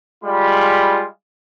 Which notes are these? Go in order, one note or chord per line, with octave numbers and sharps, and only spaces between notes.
G3 G#3 F4 B5